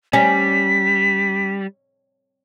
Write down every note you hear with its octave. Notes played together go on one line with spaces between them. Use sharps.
G3 C#4 B6